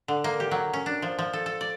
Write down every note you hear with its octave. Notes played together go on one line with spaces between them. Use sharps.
D3
A#3
G4
F#3
C#4
D4
F3
F3
A4
A4
D5